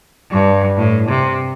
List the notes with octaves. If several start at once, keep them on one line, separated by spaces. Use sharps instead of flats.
G2
A2
C3